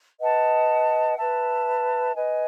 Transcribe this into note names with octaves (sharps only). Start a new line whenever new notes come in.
B4 D#5 F#5 A5
B4 E5 A5
B4 D#5 G#5